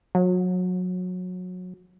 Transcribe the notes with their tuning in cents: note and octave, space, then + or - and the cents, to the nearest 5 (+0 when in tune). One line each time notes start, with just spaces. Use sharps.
F#3 -25